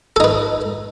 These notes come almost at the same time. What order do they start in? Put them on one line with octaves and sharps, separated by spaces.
A4 D#4 B4